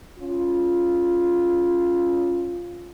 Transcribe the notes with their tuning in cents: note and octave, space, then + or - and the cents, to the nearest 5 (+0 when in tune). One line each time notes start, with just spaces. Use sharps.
C#4 +0 F4 +0